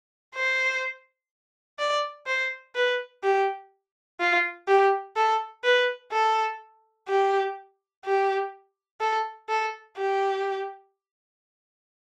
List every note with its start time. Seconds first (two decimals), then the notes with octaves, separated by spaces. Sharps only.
0.35 C5
1.79 D5
2.27 C5
2.75 B4
3.23 G4
4.20 F4
4.68 G4
5.16 A4
5.64 B4
6.12 A4
7.09 G4
8.05 G4
9.01 A4
9.49 A4
9.97 G4